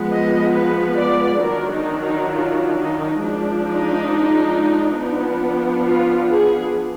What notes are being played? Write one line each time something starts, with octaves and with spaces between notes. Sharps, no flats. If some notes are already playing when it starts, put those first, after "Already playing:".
Already playing: F3 G#3 B3
D#5
B4
D5
D#3 F#3 D4 A#4
D#4
D#4
F4
D#4
F3 G#3 D4
D#4
F3 B3 D4
F4
G#4